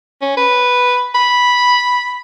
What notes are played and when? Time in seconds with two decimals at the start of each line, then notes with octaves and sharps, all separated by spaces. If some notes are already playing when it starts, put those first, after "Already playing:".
0.21 C#4
0.37 B4
1.15 B5